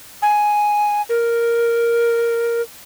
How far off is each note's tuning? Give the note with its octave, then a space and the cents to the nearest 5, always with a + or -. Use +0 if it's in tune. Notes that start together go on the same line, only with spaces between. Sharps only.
G#5 +5
A#4 +0